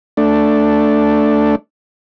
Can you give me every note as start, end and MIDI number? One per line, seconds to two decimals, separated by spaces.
0.17 1.56 57
0.17 1.56 62